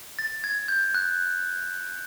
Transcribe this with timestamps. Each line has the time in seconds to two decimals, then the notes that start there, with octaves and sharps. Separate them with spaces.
0.19 A6
0.44 G#6
0.68 G6
0.94 F#6